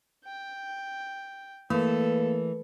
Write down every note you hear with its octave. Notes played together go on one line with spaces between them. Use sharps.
G5
E3 A3 A#3 A4 A#4